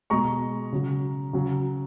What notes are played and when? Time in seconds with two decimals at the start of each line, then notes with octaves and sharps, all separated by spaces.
0.10 B2 G#3 A#5 C#6
0.73 C#3 F#3
1.33 C#3 F#3